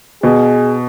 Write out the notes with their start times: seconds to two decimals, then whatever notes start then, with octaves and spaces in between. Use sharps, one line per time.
0.23 B2 G#4